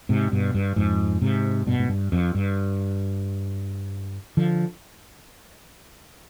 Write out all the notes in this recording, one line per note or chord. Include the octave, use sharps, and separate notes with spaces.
G#2 C3
G2 B2
G2
F2 G#2
G#2 C3
G2 B2
G#2
G2
F2
G2
D3 F3